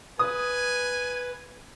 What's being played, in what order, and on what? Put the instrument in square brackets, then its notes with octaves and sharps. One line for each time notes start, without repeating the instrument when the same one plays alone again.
[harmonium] B4 [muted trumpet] G#5 [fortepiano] D#6